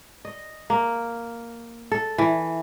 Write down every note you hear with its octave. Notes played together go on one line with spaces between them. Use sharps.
D#5
A#3
A4
E3